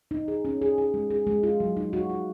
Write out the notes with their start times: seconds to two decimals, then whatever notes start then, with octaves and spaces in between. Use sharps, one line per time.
0.11 D#4
0.28 G#4
0.45 C#4
0.62 G#4
0.78 G#4
0.94 G#3
1.10 G#4
1.27 G#3
1.43 F4
1.60 F#3
1.77 D#4
1.93 F#4
2.10 F4